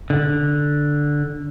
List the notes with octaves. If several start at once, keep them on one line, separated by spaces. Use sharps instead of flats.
D3